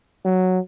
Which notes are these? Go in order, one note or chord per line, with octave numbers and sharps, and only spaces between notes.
F#3